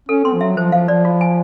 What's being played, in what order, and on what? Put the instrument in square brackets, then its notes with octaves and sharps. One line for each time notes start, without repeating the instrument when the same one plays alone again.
[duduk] C#4 [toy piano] A4
[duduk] C4 [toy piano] C6
[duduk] F3
[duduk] F#3 [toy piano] E5
[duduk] F3 [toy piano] C5
[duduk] F3 [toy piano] F5
[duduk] F3 [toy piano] D5
[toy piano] F4
G#5